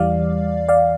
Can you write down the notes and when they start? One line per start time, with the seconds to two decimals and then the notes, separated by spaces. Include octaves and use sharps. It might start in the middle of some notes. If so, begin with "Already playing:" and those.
Already playing: E2 E3 G3 D5 F5
0.69 D5 F5